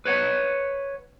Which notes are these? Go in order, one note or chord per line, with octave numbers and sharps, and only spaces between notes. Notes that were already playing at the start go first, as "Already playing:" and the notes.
B4 C#5 F#5